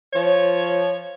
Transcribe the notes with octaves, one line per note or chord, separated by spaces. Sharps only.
F3 C#5